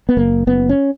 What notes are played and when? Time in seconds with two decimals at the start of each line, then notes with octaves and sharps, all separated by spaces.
0.09 B3
0.17 F#1 A#3
0.47 F#1 B3
0.69 C#4